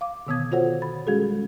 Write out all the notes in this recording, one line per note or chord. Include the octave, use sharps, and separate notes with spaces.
F5 D6
B2 D3 D#3 B3 D#6 G#6
F4 F#4 A4 C5 C#5 F#5
B5 A6
G3 G#3 C#4 F#4 G#4 A4